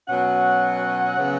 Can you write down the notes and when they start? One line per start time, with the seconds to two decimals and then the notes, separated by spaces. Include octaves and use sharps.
0.08 B2 F#3 C#4 F#5
1.18 C#3 F#3 B3